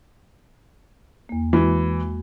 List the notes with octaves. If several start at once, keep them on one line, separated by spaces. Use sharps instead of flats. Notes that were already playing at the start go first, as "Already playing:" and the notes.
E2 A#3
E3 G#3 F#4